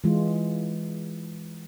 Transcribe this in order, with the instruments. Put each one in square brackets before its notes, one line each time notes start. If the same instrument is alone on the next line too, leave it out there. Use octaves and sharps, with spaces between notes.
[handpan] E3 G#3 F4